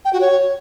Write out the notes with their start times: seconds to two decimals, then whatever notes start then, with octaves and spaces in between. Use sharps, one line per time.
0.05 G5
0.13 F#4
0.21 C#5